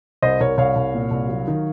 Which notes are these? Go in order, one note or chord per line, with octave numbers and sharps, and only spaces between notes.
C2 C5 D#5
C2 A#4 C#5
C2 C#5 F5
C2
A#2
C2
F#3
D#3